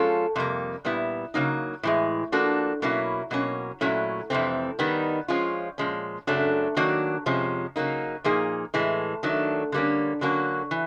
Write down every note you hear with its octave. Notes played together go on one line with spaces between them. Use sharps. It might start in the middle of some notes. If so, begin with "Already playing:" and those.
Already playing: F3 G#3 C#4 F4 A4
F2 C3 G3 A#3
A#2 G3 B3 E4
C#3 F#3 A#3 D#4
A2 E3 G#3
F3 A#3 D4 F#4 A4
B2 F#3 A#3 C#4 E4
B2 F#3 A#3 C#4
A#2 F#3 A3 C#4 E4
F2 C3 E3 A3 C4
D#3 G3 B3 D#4
F3 G#3 C#4 F4
A#2 F3 G#3 C#4
F#2 C#3 F#3 A3 D4
D#3 F#3 A#3 D4 F#4
F2 C3 F3 G#3 C#4
C#3 F#3 A#3 D#4
A#2 F3 A#3 D#4 G#4
A2 E3 G#3
D#3 F#3 A3 D4
D3 G3 A#3 C#4
D3 F#3 A#3 C#4 F#4
E3